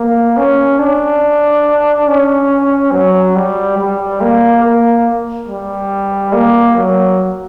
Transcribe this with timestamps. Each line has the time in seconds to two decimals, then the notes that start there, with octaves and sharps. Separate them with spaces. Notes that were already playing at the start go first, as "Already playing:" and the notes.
Already playing: A#3
0.37 C#4
0.79 D4
2.08 C#4
2.92 F#3
3.36 G3
3.77 G3
4.21 A#3
4.63 A#3
5.48 G3
6.33 A#3
6.75 F#3